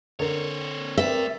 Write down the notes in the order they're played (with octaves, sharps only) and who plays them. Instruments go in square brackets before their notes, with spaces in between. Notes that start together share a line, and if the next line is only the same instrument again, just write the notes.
[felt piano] D3 A4 A#4 [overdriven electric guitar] C4 C#5
[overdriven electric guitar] A3 D5 [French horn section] C4 A#4 [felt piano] B4 [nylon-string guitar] E5